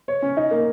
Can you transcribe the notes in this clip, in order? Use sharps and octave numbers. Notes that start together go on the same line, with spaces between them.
C#5
C#4
D#4
A#3